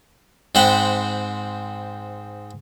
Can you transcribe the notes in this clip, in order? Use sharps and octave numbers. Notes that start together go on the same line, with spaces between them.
G#2 C4 C5 F#5 G5 B5